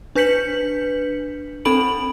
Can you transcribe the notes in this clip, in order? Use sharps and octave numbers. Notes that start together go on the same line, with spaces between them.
D4 B4 G6 B6 C#7 F#7
C4 D4 A4 B5 D7 F#7